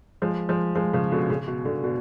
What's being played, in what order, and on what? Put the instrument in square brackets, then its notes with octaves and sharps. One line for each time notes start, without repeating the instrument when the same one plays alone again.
[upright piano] F3 G#3
F3 G#3
F3 G#3
C#3 F3
B2 D3
C#3
B2
B2 D3
B2 D3